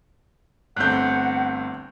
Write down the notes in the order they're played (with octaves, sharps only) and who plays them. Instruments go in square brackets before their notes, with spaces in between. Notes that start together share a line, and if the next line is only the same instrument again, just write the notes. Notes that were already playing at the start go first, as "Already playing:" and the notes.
[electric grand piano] G1 A3 C4 [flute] F#5 [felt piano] F#6 G6